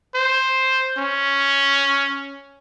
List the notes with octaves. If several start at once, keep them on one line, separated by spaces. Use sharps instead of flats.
C5
C#4